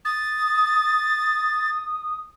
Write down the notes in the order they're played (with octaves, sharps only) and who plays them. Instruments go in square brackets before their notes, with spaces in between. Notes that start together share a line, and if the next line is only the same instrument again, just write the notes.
[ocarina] D#6 [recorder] A6